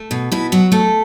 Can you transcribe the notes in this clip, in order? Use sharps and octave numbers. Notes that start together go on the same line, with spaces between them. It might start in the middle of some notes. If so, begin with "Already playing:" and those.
Already playing: A3
B2
B2 E4
F#3 F#4
A3 A4